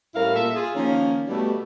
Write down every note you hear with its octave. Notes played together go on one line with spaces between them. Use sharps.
A2 G3 C#4 E4 A#4 F5
A#2 A4 E5
F4 G#4
D#3 F3 A#3 C#4
B2 G3 A3